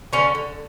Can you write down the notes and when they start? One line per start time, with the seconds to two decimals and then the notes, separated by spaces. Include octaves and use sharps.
0.13 D3 C#4
0.35 D3